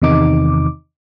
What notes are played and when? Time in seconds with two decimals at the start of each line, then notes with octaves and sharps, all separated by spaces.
0.02 E2 C3 D#3 D#4 D6